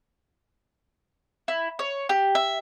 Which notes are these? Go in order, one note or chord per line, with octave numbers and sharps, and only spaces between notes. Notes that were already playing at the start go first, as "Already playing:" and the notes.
E4
C#5
G4
E5